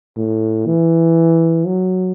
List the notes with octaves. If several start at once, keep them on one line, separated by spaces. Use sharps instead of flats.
A2
E3
F#3